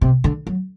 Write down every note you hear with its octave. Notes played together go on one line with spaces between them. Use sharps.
C3
D3
F#3